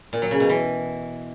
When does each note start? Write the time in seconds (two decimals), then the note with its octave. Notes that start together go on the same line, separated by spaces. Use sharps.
0.13 A#2
0.22 F#3
0.31 C#3
0.40 B2
0.49 E3